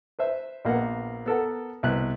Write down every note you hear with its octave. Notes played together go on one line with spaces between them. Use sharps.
B4 C5 E5
A#1 A#3 B3 F#5
B3 A4 A#4 F#5
C2 B2 B4 F#6